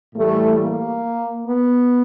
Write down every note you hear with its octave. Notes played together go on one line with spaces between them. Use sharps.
A2 E3 G3 A3
A#3
B3